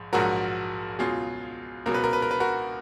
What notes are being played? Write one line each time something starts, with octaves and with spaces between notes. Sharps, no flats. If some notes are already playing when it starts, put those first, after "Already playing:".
Already playing: A#1 G#2
A#1 G#2 F#3 F#4 A#4
C#2 B2 F#3 F4 G#4
C#2 B2 F#3 A#4
B4
A#4
B4
A#4
B4
F#4 A#4